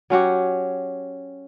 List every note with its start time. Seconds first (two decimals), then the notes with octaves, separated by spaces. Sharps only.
0.10 F#3 C#4 F#4 G4